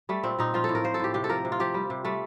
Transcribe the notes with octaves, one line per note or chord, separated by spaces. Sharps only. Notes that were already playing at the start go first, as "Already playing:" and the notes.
G3 A3
A#2 C4
A#2 D#4
F3 F4
A4
A2
A#4
F3 C5
A4
A2 G4
C3 G4
A4
F3 A#4
C3
F4
F3 G4
G3
C3
G3 A3